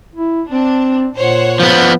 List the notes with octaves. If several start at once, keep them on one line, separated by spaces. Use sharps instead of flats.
E4
C4 D4
A#2 C5 C#5 F#5
F3 B3